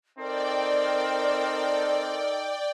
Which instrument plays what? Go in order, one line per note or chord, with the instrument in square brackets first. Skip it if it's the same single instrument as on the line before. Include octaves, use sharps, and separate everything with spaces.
[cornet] C4 [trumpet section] D#4 A4 [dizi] A#4 [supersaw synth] D5 G5